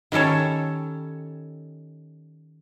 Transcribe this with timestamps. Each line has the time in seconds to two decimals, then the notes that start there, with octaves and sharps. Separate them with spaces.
0.12 D#3 G3 C#4 A4 C#5